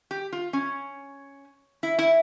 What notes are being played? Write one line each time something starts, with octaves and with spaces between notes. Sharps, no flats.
G4
F4
C#4
E4
E4